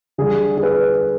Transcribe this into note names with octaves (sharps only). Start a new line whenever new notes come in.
D3 G3 G#4
G#4
B4